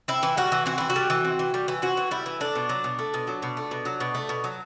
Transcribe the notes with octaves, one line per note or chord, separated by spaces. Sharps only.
C4 E4
E3
G3 F#4
E3
C4 F#4
E3 E4
F#4
G3
E3
C4
E3
G3
E3
C4 F#4
E3
G3 E4
E3
A3 D4
B2
F#3
B2
A3
B2
F#3
B2
A3
B2
F#3
B2
A3
B2
F#3